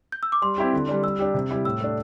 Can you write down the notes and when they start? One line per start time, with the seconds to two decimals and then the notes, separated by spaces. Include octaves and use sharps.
0.12 G6
0.23 E6
0.32 D6
0.42 G3 C6
0.58 C4 E4 G4
0.73 D3
0.88 G3 D4
1.03 G3 E6
1.19 D4 G4
1.34 C3
1.49 G3 E4 G4
1.65 A2 E6
1.81 A3 D4